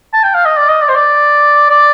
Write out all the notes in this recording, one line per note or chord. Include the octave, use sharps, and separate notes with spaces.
A5
G5
F5
D#5
D5
D#5
D5
C5
D5
D5